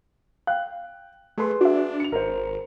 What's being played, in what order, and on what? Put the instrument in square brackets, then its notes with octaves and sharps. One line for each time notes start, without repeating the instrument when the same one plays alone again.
[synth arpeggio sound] F5 [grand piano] G5 F#6
[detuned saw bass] A3 [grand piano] G#4 B4 C6
[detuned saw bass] D4 [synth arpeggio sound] F#4 E5
[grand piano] C#7 F7
[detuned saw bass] G#1 [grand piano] A#4 C5